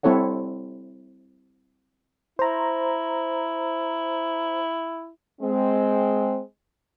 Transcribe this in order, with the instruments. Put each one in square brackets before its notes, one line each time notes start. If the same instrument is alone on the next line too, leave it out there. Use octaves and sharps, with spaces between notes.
[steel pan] G3 C4 E4 A4 C#5 F#5
[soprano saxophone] E4 [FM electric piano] C5 A#5
[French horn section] G#3 C4